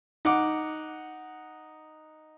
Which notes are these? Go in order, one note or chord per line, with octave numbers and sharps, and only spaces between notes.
D#4 F#5 D6